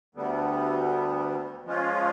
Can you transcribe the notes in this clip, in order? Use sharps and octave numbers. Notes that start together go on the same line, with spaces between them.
D2 D3 G3 B3
F3 G#3 C#4 F4